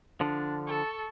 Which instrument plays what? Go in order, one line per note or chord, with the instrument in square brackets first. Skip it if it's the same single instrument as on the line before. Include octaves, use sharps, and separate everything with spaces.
[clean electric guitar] D3 F3 [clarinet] D4
[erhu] A4 [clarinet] C#6